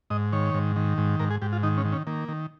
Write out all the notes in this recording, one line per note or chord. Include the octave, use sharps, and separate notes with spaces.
G#2 D#5
D#3 C#5
G#2
D#3
G#2
G#2 A#4
G#4
G#2 G4
F4
D#3 D#4
C#4
D#3
C#4
D#3 A#3
D#3